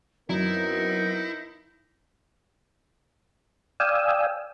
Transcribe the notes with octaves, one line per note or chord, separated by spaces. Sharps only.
F#2 B3 C4 D#4 E4 A#4
D5 F5 G5 G#5 D#6 E6